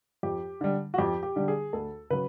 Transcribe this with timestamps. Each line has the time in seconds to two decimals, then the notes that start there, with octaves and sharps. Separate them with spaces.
0.23 F2 G4
0.61 D3 G3
0.94 F#4
0.98 F2 G4
1.23 G4
1.36 D3 G3
1.48 G#4
1.73 D2 A4
2.10 C#3 F#3 B4